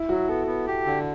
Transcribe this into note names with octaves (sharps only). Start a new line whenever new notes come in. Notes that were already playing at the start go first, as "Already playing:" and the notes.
Already playing: E4
F#3 F#4
B3 A4
B3
G4
D3